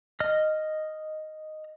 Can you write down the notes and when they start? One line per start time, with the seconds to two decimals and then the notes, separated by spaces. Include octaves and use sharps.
0.20 D#5 F6